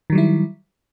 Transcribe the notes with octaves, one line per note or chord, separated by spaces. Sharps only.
D#3 F#3 G3 E4